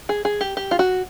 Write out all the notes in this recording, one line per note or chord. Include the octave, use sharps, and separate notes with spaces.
G#4
G#4
G4
G4
F4
F#4